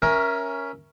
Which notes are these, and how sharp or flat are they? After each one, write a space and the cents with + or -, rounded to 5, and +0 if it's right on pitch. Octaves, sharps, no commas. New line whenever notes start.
C#4 +0 A#4 +15 E5 +0